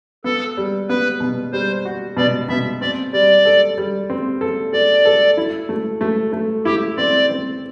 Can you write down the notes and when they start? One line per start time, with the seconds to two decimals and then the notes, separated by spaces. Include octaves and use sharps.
0.24 B3 A4
0.57 G3
0.89 B3 B4
1.20 B2
1.53 G3 C5
1.85 F#4
2.17 B2 D5
2.49 B2 E5
2.81 C4 D5
3.13 G3 D5
3.45 A4
3.78 G3
4.10 C4
4.41 A4
4.73 A4 D5
5.05 A4
5.37 E4
5.69 A3
6.01 A3
6.33 A3
6.65 E4 G4
6.97 C4 D5
7.30 C4